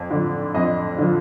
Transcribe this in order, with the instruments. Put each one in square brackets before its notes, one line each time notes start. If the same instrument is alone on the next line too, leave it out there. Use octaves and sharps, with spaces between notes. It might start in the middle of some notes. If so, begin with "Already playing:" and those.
Already playing: [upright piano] F2
D3 F3
F2 D#5
D3 F3